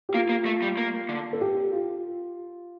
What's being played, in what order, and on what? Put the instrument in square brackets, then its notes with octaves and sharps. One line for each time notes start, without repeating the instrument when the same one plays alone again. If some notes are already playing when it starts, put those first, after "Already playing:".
[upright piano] G4
[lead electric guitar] A#3 [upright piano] F4
[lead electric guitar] A#3
A3
G3
A#3
D3
[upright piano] A4
G4
F4